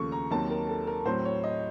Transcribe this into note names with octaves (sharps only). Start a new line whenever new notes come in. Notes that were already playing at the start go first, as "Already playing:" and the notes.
Already playing: D#2 C#3 F3 A3 C#6
A#5
D#2 D#3 F#3 C4 A5
A#4
A4
A#4
A2 F#3 C4 C5
C#5
D#5